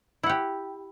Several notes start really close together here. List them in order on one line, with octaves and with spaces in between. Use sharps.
E4 F#5 G4